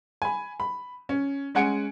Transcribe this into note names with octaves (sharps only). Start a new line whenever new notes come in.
G#5 B5
B5
C#4
G#3 C#4 F#5 G#5 C#7 D7